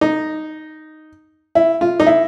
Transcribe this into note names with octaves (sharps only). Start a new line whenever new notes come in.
D#4
E4
F4
D#4
E4